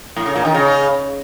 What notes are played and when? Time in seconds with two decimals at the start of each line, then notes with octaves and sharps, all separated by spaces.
0.16 A2
0.26 C#3
0.35 A#2
0.45 D#3
0.54 C#3